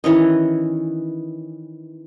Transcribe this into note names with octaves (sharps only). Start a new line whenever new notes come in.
D#3 E3 C#4 D#5